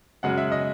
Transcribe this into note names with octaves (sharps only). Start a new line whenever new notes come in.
F#2 C#3 G#3 F#5
E5
D#5